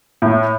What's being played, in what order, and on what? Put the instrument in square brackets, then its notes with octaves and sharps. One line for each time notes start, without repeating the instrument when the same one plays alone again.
[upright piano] A2